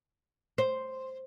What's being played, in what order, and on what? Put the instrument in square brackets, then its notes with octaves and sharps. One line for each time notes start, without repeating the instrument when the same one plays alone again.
[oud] C5